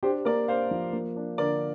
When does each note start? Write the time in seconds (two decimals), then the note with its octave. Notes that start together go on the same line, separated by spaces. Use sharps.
0.03 D4 G4 C5
0.25 A#3 A#4 D5
0.48 D4 C5 F5
0.71 F3
0.93 A#3
1.16 D4
1.38 D3 A#4 D5